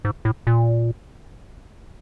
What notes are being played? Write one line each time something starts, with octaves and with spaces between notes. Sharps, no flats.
G#2
A2
A#2